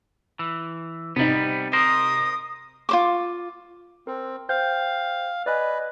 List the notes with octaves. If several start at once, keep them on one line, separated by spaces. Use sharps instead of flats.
E3
C3 G3 B3 D#4
A#4 C5 D#6
F4 C5 D6
C4 A#4
C5 F5 G5 G6
B4 D5 D#5 G#5